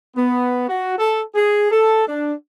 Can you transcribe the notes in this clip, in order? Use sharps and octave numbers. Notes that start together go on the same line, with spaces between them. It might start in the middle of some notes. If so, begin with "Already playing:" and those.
B3
F#4
A4
G#4
A4
D4